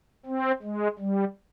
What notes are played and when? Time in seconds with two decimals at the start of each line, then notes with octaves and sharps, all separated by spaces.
0.26 C4
0.62 G#3
0.99 G3